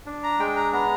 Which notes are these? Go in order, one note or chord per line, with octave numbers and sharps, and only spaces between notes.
D4
A#5
G#3 G5
A#5
B3 A#5